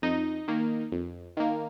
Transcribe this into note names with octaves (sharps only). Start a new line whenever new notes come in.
F2 D#4 D#5
D#3 A#3
F2
D#3 A#3